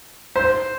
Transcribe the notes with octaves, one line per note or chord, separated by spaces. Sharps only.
C5